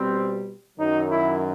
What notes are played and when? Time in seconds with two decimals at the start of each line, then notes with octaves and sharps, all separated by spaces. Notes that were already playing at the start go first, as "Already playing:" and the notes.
Already playing: B2 G3 C4
0.77 F#2 D#3 F#3 D#4
1.09 E4